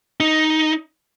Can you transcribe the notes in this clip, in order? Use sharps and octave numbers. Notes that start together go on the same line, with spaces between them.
D#4